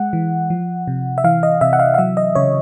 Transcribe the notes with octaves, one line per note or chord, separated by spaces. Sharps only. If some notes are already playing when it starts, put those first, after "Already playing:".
Already playing: G#3 F#5
E3
F3
C3
E5
E3 F5
D#5
C3 E5
F#5
F5
F5
F#3 E5
D#5
C#3 C#5